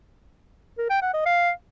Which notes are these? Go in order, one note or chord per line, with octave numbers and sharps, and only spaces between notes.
A#4
G5
F#5
D#5
F5